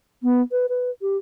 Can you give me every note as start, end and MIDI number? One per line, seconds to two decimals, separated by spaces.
0.23 0.42 59
0.52 0.66 71
0.69 0.90 71
1.02 1.17 67